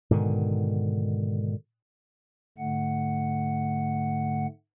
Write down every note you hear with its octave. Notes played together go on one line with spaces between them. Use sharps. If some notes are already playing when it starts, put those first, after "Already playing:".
G#2 B2 D3 D#3
G#2 D3 A3 F#5